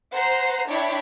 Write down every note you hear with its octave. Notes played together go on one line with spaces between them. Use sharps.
C5 F#5 A#5 C7
D4 E4 C#5 G5 B5